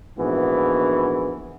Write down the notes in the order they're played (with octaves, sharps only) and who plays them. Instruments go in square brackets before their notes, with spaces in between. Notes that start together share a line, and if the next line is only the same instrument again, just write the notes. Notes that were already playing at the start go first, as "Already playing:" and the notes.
[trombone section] A#1 G#2 E3 B3 F#4